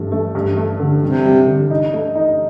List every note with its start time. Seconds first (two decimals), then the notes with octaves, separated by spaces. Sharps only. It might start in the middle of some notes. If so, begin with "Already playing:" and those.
Already playing: G2 A3
0.12 A3
0.35 G2
0.57 A3
0.79 D3
1.02 C3 G3
1.25 G3
1.47 D3
1.70 D#4
1.93 A3
2.15 D#4